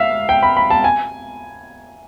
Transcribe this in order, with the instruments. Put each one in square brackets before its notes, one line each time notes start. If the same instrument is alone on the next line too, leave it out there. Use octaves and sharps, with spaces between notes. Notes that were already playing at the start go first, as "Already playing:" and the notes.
Already playing: [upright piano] E5 F5
G5
B5
B5
A5
G#5